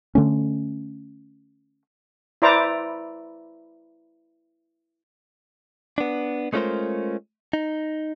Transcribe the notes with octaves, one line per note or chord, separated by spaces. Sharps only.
D3 A3 C#4
E4 B4 C5 D5 A#5 D6
B3 D4
G#3 A3 C#4 F4 A#4 C5
D#4